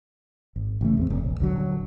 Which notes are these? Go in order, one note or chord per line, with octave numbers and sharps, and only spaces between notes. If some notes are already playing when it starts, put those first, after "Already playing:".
G#1
A1 C#3 A3
E2 G3 C4
F1
A#1
D#1 D3 F#3